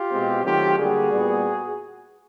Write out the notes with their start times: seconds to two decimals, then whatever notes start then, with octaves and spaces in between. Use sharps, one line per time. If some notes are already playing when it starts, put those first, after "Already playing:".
Already playing: F4 G4
0.11 B2 G#3 C4
0.44 D#3 F#3 A3 C4 F4 G4
0.78 D3 G3 A#3 F#4 G#4
1.12 A#2 G3 B3